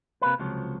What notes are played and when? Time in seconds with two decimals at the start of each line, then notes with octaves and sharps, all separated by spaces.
0.22 C3 A#3 B4
0.39 C#2 C3 F3 F#3